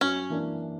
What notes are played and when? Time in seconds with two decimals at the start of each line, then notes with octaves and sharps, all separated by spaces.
0.01 F#2 C#4
0.30 E3 A#3 D4